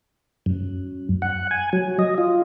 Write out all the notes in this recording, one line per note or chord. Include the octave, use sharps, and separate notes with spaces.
F#2
F#5
G#5
F#3
D#5
F4